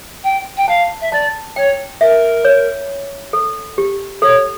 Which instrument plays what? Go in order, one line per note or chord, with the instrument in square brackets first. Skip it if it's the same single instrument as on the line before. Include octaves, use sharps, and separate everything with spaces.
[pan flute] G5
G5
[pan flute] F5 [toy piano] A5
[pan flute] E5
[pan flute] D5 [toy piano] A5
[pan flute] C#5 [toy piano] G5
[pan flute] A#4 [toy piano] E5
[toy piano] C#5
A4
G4
[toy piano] A4 [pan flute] C#5